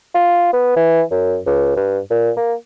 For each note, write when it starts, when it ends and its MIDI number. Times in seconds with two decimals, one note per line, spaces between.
0.15 0.50 65
0.53 0.74 59
0.76 1.02 52
1.11 1.38 42
1.47 1.72 37
1.76 1.99 43
2.10 2.31 46
2.37 2.54 58